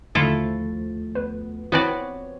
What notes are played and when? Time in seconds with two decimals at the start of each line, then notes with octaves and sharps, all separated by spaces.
0.15 D#2 D3 F3 A3 E4 F4 A4 A6
1.15 B3 B4
1.72 B3 C4 E4 F#4 B4 C#5 D5 G5